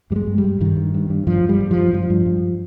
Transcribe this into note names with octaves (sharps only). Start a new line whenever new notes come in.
G2 G3
G#3
G2
G3
G2
G2 D#3
G2
G2
G2
G2 F3
G2
G3
G2
F3
G2
G2 F3
G2
G2